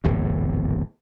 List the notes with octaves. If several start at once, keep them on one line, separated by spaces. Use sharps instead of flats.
D1 G#1 E2 A2